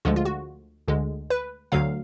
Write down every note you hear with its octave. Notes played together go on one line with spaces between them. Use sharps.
D2 D3 F3 G#3 F4
F4
F#4
D2 D3 G#3
B4
D2 D3 F#3 F5